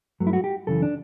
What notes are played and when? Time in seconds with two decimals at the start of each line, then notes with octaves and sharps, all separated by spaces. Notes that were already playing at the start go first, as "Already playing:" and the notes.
0.20 G2 F#3 A3
0.27 E4
0.33 F#4
0.44 G4
0.67 F#2 C#3 E3 A4
0.82 D4